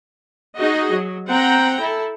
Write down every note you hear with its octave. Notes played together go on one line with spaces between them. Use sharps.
D#4 F#4 G#4 D#5
F#3
C4 F#5 G5 A#5
E4 A4